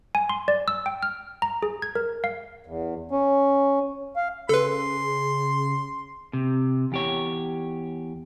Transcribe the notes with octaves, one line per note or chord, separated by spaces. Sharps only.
G#5
C6
D5
E6
G5
F6
A#5
G#4
G#6
A#4
F5
E2
C#4
F5
C#3 G#4 A4 B4 C6
C3
E2 G4 C#5